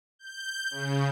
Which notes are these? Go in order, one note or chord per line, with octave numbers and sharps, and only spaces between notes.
G6
C#3